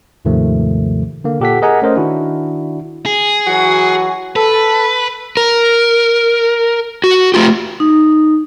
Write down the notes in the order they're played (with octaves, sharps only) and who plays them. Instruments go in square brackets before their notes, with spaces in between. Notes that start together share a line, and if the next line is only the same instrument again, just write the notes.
[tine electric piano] D#2 G#2 C3 D#3 F3 A3
D3 A#3
A#2 G4 A4 F#5 B6
G#4 A#4 D#5 F#5 G#5 A#5
A3 C#4 A#4 C5 D#5
D#3 D4 E4 F#4
[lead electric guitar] G#4
[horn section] E3 F#3 F#4
[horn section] A4 [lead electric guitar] B4
[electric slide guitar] A#4
F#4
A3 F4 G4
[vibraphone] D#4